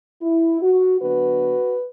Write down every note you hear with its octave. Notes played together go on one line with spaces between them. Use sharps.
E4
F#4
D3 F#3 B3 D4 F#4 B4